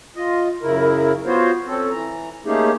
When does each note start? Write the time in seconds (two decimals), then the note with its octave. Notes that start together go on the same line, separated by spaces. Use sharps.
0.16 F4 D#5
0.62 F#2 C#3 E4 A#4
1.26 B3 F4 F#4 C5 C#5
1.67 C4 C#4 A4
1.91 E3 A#5
2.46 A3 A#3 C#4 D#4 G4 G#4